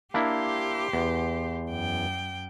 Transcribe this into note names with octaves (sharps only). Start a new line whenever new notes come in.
A#3 D4 E4 G4 C5
E2
F#2 G5